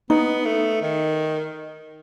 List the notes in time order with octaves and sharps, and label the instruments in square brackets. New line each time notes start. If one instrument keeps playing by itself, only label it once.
[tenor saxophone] B3 [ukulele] D#4
[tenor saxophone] A3
D#3